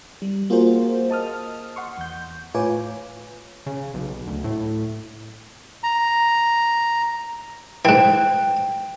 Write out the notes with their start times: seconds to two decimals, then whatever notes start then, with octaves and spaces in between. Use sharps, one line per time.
0.22 G3
0.50 A#3 F4 F#4 G#4 A#4 C5
1.09 D#5 A5 D#6 F6
1.76 F#5 C6 C#6
1.98 E2 G6
2.54 A2 F4 B4 C#5 G#5 D6
3.66 C#3
3.94 B1
4.27 D2
4.44 A2
5.83 A#5
7.85 G#2 E3 G5 F#6